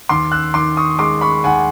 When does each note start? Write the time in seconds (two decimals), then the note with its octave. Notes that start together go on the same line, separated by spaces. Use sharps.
0.09 D#2 C6 D6
0.32 E6 F#6
0.54 D#3 C6 D6
0.77 C#6 D#6
0.99 G#3 C6 D6
1.21 B5 C#6
1.44 D#2 F#5 G#5